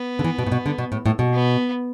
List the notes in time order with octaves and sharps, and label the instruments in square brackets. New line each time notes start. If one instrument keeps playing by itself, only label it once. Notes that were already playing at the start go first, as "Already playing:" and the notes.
Already playing: [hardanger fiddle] B3
[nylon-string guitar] D3
E3
B2
A2
B2
D3
B2
A2
A2
B2
[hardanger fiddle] B3